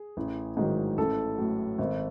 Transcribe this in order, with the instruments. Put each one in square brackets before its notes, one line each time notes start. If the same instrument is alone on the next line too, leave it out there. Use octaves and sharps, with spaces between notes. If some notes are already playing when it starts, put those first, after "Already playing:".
Already playing: [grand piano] G#4
A1
G#2 D#3 F#3
A1 A4
A2 F#3
G#1